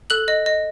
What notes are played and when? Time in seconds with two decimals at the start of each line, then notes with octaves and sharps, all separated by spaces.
0.10 A4 F#6 F#7
0.28 D#5
0.46 D#5